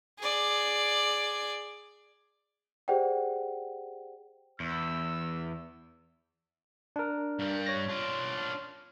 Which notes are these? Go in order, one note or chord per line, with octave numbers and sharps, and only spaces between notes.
G#4 D5
G4 G#4 C5 D5 F#5 G5
E2 E6
D4 A#4
G2 G3
C#5 A#6
D4 F4